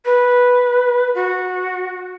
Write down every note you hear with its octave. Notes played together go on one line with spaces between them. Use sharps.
B4
F#4